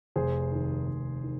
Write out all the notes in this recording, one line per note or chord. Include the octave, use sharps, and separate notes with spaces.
F1 G#4 C5
D#2 D#3
F1
D#3